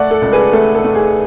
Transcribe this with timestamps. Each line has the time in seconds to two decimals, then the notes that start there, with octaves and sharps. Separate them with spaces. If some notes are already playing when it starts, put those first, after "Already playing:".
Already playing: A3 D5 F#5
0.11 A4
0.22 C#2
0.33 G#4 B4
0.53 A3 A4
0.75 A4
0.84 A3
0.95 G#4